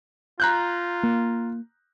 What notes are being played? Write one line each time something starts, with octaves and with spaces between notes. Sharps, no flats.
F4 A#5 F#6 G6
A#3